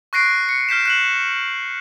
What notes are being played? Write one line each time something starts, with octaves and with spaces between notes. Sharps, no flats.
C#6 F#6 A#6 C7 D7 D#7
C#7
F6 G6 B6 E7
F#6 E7 F#7